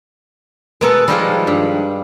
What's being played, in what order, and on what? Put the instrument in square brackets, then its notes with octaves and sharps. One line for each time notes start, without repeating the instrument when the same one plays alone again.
[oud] B2 B3 A#4 [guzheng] G#3 A4
[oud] D#3 F3 G#3 [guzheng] G3 D#4 F4
[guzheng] G2